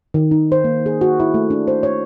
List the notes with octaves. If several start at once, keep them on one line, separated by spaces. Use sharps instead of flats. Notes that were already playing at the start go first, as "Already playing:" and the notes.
D#3
D#4
C5
A#3
G#4
F#4
E4
A3
D4
C5
C#5